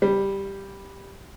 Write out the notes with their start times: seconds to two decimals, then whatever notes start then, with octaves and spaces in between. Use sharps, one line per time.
0.02 G3